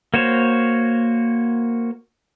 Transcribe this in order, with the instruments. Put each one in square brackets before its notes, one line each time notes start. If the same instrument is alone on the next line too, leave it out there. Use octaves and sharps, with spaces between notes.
[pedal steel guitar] A#3 F#4 C5 C#5